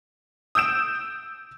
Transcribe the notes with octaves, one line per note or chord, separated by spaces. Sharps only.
D#6 E6 G6 D7 E7